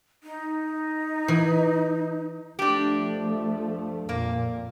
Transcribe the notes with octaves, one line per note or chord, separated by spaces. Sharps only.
D#4
E3
F3 A3 D4 G4
F2 A#2 A#3